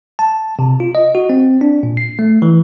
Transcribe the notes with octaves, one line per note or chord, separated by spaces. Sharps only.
A5
C3
F4
D#5
F#4
C4
D4
A#2
C7
A3
E3